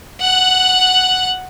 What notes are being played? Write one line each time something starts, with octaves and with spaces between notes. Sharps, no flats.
F#5 F#6